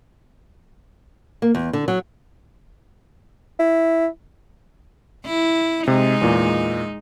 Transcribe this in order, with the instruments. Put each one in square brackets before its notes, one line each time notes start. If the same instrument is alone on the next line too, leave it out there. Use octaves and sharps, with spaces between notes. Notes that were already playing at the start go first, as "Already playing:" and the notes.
[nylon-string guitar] A#3
E2
D3
F#3
[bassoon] E4
[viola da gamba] E4
[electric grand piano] C3 [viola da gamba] G#3 D#4
[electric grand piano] E2 A#2